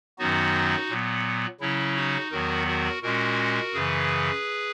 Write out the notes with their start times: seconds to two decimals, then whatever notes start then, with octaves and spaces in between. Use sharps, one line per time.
0.18 F#2 D#3 F#3 B3 D#4 F#4
0.89 A#2 F#3 B3
1.61 C#3 F#3 C#4 E4
1.96 D#4 F#4
2.31 E2 D#3 F#3 B3 F#4 A#4
2.67 F#4 A#4
3.02 A#2 G#3 C#4 F#4 A#4
3.74 F#2 C#3 E3 G#4 B4